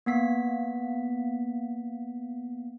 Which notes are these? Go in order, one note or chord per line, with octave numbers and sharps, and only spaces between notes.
A#3 B3 B6